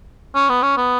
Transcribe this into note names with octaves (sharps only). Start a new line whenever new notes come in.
C#4
B3
C#4
B3